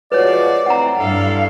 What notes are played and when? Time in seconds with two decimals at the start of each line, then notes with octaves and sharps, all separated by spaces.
0.12 F3 G#3 F#4 B4 C#5 D5
0.66 E3 A3 C4 F#5 A#5
0.99 G2 D4 E4 A4 F5